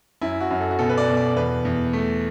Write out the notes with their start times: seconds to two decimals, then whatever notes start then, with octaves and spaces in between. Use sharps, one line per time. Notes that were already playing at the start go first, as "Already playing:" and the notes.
0.21 F#2 E4
0.41 F#4
0.51 F#2
0.60 A4
0.71 F#4
0.79 B2 A4
0.89 B4
0.98 D5
1.08 B2
1.17 D5
1.36 E2 B4
1.65 E2
1.93 A3